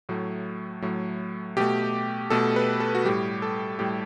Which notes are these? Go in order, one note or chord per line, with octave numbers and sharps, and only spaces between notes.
A2 F#3 A3
A2 F#3 A3
B2 A3 G4
B2 A3 A4
B4
A4
F#4
A2 G3 G4
A4
A2 G3 G4